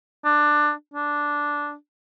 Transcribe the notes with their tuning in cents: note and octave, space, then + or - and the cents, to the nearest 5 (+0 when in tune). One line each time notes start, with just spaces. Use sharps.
D4 +15
D4 -5